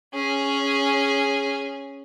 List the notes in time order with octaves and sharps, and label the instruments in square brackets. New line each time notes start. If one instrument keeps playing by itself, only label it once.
[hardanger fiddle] C#4 G#4